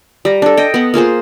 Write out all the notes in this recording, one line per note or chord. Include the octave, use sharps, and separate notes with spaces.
G3 A#5
D4 A4
D#5 G5
B3 F#5
A#3 F4 G#4 C5